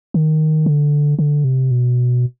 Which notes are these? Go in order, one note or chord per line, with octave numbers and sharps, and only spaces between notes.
D#3
D3
D3
C3
B2